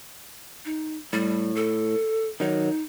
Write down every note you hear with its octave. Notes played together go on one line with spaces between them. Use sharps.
D#4
A2 G3
A4
D#3 F#3 D#4